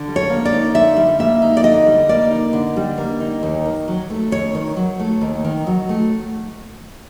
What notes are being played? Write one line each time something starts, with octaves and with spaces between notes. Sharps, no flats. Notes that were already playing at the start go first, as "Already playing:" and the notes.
Already playing: D3
G3
C#5
A#3
D5
D#4
D3 E5
G3
A#3 E5
D#4
D5
D3 D#5
G3
A#3 D5
D#4
D3
G3
A#3
D#4
D#2
D#3
F#3
A3
D#2 C#5
D#3
F#3
A3
D#2
D#3
F#3
A3